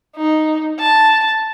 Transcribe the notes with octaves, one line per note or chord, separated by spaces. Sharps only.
D#4
A5